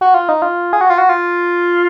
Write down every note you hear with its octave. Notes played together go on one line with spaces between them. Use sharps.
F#4
F4
D#4
F4
G#4
F#4
F4
F#4
F4